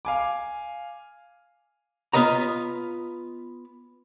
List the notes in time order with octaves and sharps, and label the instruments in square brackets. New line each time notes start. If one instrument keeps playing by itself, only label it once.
[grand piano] F5 G#5 D6
[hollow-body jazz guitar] B3 F4 B4 D#5 A#5